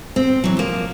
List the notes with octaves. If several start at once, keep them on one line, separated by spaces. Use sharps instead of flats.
C4
E3 F#3
F3 A#3